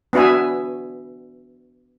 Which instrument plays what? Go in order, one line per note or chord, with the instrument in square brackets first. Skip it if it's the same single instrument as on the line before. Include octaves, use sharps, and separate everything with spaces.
[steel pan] B3 D4 F#4 E5 G#5